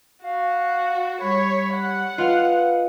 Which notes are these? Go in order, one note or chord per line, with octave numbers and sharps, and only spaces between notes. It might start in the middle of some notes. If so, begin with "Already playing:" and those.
F#4 F5
G3 C#5 B5
F#5
F4 B4 D#5 F5